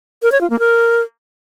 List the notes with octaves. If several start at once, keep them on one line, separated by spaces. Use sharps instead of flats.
A#4
C#5
F4
A#3
A#4